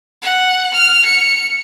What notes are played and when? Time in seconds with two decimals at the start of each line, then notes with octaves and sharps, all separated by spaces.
0.22 F#5
0.74 F6
1.05 C#7